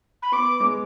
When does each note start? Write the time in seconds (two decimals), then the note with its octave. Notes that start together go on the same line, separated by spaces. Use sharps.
0.22 B5
0.32 B3 D6
0.60 G#3